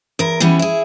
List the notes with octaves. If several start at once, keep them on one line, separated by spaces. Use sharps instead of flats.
E2 A#4
E3 G3 B3 C#4
E4 G#4